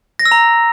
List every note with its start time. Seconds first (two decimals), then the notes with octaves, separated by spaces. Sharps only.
0.19 A#6
0.25 E6
0.32 A#5